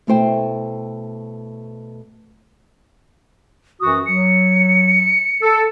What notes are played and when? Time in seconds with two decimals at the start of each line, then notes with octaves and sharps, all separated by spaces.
0.07 B2 A3 E4 C5 G5
3.81 F#2 E3 F#4 D#6
4.06 F#3 C#7
5.42 A4